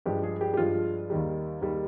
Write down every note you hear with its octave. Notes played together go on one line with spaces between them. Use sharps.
G2 F3 G#3 G4
G#4
G4
G4
G2 F3 G#3 F4
D#2 D#3 G3
D#2 D#3 G3